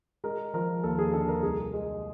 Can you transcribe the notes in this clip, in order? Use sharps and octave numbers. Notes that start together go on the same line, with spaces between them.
G#3 A#4
F3 A#4
D#2 A4
G#4
D3 A4
A#4
C2 G#4
G#3